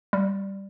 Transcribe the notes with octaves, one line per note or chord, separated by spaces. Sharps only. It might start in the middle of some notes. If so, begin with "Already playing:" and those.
G3